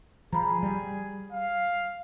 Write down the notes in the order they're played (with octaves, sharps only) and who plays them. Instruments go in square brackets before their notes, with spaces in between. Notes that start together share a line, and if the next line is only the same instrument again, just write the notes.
[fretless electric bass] F3 [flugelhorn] G#4 [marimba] A#5 B5
[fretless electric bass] G3
[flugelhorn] F5